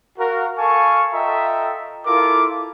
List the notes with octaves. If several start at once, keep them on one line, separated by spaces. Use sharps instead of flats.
F#4 A#4 F5
A4 F5 G#5 A5 C#6
F4 A4 D#5 E5 G5 A#5
E4 F4 A4 A#4 D6